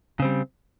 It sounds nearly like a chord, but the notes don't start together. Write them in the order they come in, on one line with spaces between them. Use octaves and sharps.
C#3 C4 G3